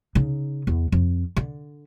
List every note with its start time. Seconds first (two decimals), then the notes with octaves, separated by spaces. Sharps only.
0.15 C#3 D#4
0.67 E2
0.92 F2
1.36 D3